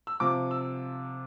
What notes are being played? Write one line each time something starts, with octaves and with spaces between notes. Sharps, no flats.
E6
C3 F3 D6
E6